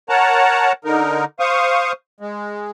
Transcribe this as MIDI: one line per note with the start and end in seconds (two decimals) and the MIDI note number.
0.09 0.72 70
0.09 0.72 73
0.09 0.72 78
0.09 0.72 81
0.09 0.72 82
0.85 1.25 50
0.85 1.25 63
0.85 1.25 70
1.40 1.92 72
1.40 1.92 77
1.40 1.92 85
1.40 1.92 87
2.20 2.71 56